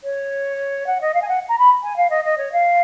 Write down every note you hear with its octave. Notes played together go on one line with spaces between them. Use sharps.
C#5
F#5
D#5
F5
G#5
F#5
A#5
B5
G#5
F5
D#5
D#5
C#5
F5